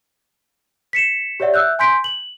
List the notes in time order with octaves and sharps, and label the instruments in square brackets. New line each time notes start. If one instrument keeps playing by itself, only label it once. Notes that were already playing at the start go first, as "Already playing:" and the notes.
[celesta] B6 C#7 E7
G4 C#5 D5 E5 F#5
E5 E6 F#6 G6
G#5 C6 G6 B6 D7
F#7